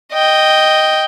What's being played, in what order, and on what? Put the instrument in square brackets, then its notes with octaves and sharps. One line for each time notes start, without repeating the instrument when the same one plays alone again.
[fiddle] D#5 G5